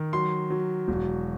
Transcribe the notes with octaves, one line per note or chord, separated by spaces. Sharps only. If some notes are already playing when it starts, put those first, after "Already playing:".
Already playing: D#3
F#3 C6
F#3
E1